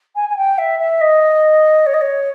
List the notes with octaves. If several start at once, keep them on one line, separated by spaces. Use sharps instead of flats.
G#5
G#5
G5
E5
E5
D#5
C#5
D#5
C#5